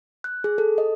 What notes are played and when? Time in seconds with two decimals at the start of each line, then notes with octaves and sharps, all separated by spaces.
0.24 F#6
0.44 G#4
0.58 A4
0.78 D#5